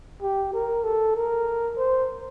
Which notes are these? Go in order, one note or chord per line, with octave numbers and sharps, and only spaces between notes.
G4
A#4
A4
A#4
C5